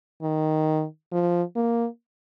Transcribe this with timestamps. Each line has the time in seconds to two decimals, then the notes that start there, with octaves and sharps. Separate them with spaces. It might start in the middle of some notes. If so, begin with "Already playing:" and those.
0.22 D#3
1.12 F3
1.56 A#3